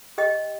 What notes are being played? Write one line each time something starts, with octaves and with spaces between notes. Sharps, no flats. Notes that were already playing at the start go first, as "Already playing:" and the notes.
G4 D#5 G5